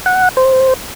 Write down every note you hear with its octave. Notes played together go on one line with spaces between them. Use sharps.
F#5
C5